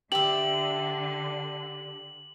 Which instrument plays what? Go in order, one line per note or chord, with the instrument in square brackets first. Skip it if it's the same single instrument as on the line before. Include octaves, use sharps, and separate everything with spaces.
[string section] D3 [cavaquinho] G4 E5 [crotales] F#7